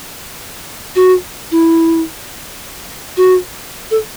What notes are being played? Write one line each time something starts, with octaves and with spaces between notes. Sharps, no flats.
F#4
E4
F#4
A4